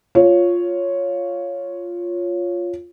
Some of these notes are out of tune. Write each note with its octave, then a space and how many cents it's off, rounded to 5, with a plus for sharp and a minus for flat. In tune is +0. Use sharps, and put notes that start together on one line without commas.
F4 +0 C#5 +0